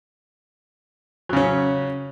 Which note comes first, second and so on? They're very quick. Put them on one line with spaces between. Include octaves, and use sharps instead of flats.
F#3 C#3 C#4